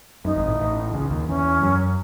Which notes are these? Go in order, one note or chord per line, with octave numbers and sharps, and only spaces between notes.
F#2 D#4
G#1 G#2
A1 A2
A1 A2
C#2 C#3
D#2 D#3
E2 E3 C#4
F#2 F#3